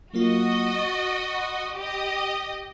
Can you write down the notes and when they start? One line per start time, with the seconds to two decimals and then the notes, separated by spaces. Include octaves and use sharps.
0.13 F#3 A#3 F4 F#4 D#5
0.75 C#6 A6
1.35 B5 C6
1.75 G4 D#5